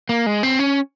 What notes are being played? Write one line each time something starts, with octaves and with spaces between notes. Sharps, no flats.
A#3
G#3
C4
C#4